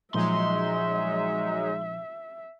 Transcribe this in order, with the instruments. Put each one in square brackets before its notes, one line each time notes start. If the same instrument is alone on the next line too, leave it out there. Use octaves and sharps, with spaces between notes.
[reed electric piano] A#2 F3 [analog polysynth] F#3 G#3 D#4 [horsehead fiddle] E5 [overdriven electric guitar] C6